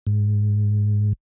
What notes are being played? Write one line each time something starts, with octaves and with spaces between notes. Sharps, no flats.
G#2